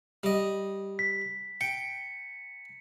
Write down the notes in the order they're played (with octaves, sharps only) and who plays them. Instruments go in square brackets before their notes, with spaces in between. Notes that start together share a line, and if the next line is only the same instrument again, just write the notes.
[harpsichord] G3 D#5
[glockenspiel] B6
[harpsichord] G5 [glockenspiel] C#7